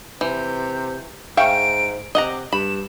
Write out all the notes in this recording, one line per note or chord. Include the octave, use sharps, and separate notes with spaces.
C3 E3 G6
G#2 E5 F5 G5 C#6 D7
C3 D#5 F#5 A#5 D6
G2 B5 E7